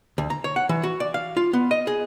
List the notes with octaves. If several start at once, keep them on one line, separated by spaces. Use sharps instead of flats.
D2
A#5
C#5
F#5
E3
F#4
D5
F5
F4
B3
D#5
G#4